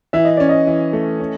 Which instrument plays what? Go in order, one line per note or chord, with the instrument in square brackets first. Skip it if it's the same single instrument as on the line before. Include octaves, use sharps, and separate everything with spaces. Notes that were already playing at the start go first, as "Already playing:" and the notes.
[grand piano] E3 [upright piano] E5
[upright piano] D#5
[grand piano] C#4 [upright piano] D5
[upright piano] D#5
[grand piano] E3
A3
C#4